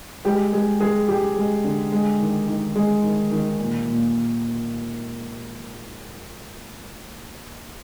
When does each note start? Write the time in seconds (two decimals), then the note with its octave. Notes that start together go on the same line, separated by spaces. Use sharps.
0.25 G#3 G4
0.53 G#3 G#4
0.80 G#3 G#4
1.08 G#3 G4
1.37 G#3
1.64 D3
1.92 G#3
2.20 D#3
2.48 D#3
2.76 G#3
3.03 D#3
3.31 D#3
3.59 A#2
3.87 A#2